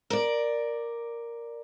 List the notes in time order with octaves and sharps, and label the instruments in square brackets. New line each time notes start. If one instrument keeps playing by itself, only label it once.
[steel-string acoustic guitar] A#4 D5